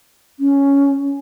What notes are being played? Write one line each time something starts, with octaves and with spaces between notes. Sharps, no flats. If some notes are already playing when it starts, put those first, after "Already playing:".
C#4